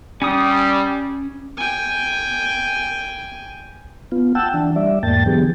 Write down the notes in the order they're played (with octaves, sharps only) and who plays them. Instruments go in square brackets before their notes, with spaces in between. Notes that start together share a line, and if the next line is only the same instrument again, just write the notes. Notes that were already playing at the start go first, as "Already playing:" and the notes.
[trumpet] G3 [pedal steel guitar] C#4 D#6
[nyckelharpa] G5 G#5
[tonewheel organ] B3 F4
F#5 G5 A5 E6
E3 D4
G3 D5 E5
E2 G#2 A#3 G5 A5 A6
D3 E3 F#3 B3 G4 G#4